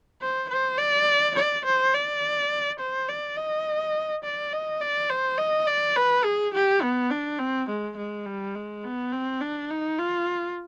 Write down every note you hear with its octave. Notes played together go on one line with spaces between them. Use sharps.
C5
C5
D5
D5
C5
D5
C5
D5
D#5
D5
D#5
D5
C5
D#5
D5
B4
G#4
G4
B3
D4
C4
G#3
G#3
G3
G#3
B3
C4
D4
D#4
F4